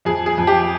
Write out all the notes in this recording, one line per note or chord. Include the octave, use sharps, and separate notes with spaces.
F2 G#4
G#4
F2
G4